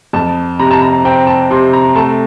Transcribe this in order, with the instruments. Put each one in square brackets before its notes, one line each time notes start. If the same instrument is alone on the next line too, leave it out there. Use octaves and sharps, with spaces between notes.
[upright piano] F2 A5
C3 A#5
A5
A#5
C4 G5
A5
C3 C6
A#5
A3 A5